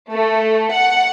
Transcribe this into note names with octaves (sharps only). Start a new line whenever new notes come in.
A3
F#5